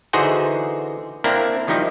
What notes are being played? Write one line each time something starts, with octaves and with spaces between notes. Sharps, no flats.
D3 E3 D#4 F#4 G#4 C5
A#3 C4 D4 E4 A#4
D#3 F3 G3 D#4 E4